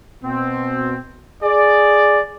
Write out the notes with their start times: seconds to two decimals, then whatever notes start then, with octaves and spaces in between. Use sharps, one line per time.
0.23 B2 C4
1.43 G#4 D5